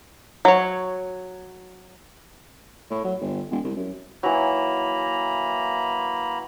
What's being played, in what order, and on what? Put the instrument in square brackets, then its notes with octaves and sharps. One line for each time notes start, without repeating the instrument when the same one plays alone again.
[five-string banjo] F#3 C#5
[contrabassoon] A2
F#3
G1
E1
C2
F#2
[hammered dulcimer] E3 F#3 [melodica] A#3 A#5 B5